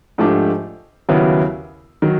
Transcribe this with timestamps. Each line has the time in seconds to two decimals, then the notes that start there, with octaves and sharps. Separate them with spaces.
0.18 G#2 F3 A3 D4 G4
1.09 D#2 C#3 F#3 B3 E4
2.02 D#3 F#3